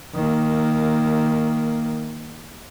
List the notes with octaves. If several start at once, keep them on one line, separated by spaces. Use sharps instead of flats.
D#3 A#3